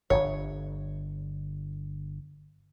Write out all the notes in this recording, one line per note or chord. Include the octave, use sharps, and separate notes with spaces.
D1 G1 C#5